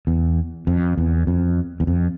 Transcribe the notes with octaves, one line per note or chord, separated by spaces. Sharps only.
E2
F2
E2
F2
E2
F2